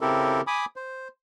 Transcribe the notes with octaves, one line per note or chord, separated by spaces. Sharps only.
C#3 C4 E4 G4 A4 A#4
G#5 B5 D6 D#6
C5